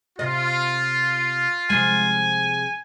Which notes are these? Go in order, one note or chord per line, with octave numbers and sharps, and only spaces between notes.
C3 F4 D#5
C3 F3 G#3 G#5